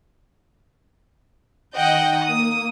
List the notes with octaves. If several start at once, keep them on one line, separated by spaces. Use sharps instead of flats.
D#3 D#5 F#5 G5
A#3 D#6